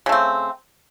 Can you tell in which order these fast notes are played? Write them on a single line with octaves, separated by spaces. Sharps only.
C#3 A3 C4